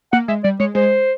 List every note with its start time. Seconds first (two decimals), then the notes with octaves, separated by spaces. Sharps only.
0.13 A#3 F#5
0.28 G#3 E5
0.44 G3 D5
0.60 G#3 C#5
0.75 G#3 C5